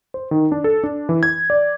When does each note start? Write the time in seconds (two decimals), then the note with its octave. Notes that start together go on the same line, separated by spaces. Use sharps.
0.14 C5
0.31 D#3
0.52 D4
0.64 A4
0.84 D4
1.09 E3
1.23 G#6
1.50 D5